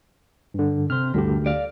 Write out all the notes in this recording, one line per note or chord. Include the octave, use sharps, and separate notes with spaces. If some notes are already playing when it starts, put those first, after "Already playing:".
G2 D3
C3 C5 F6
D2 G2 D3 G4
D5 F5